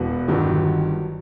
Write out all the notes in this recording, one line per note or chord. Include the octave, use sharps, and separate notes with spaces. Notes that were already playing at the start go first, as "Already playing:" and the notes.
Already playing: E1 E2 B2 B4
G1 G2 D#3 F#3